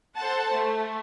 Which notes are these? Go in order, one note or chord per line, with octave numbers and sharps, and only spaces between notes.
A4 C5 F#5 A5
A3